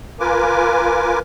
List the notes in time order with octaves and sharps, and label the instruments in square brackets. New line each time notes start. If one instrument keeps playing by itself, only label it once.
[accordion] F4 A#4 B4 G#5 D6